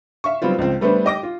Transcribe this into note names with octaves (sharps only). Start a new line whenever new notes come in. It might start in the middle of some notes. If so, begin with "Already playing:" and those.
E5 F5 C#6
F#3 G3 B3 C4 F4
C#2 F3 C4
G3 A3 B3 D4 B4 C5
G4 D#5 D6 A#6
F4